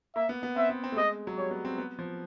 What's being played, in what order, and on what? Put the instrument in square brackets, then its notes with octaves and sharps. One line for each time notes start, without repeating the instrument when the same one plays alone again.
[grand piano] A#3 [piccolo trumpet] E5
[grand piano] B3
B3
[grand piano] C4 [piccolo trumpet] E5
[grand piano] B3
C4
A3
[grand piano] G#3 [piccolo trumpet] D#5
[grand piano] F#3
[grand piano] G3 [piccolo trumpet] C#5
[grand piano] B3
C4
B3
F3